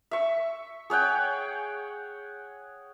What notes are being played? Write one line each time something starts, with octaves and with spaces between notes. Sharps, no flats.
E5 C#6
G#4 C#5 F#5 G5